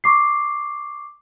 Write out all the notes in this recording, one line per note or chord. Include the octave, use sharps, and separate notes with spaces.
C#6 D6 C7